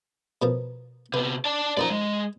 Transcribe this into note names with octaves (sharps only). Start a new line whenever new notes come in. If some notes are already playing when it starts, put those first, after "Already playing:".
B2 F3 A#4
C3 B3 B4
D5 A5
F#2 D#3 F3 D5 A#5
G#3